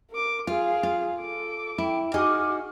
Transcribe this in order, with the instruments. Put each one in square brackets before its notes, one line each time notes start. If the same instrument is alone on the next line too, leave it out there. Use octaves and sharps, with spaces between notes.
[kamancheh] A#4 D6
[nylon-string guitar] F4 [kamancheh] G#4 F5
[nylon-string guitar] F4
[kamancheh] A4 D6
[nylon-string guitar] E4 [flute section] G5
[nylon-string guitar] D#4 G#4 D#5 [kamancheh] F#4 [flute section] D6 F6